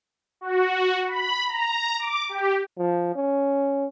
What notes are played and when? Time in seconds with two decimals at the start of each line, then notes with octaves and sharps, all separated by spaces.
0.41 F#4
1.08 B5
1.47 A#5
1.99 D6
2.29 G4
2.78 F3
3.16 C#4